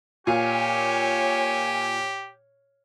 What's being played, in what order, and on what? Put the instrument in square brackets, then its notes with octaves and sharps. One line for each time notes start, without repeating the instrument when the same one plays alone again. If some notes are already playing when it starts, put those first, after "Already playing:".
[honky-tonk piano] A#2 F5 [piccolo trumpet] G4 [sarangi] C#5 [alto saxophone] G#5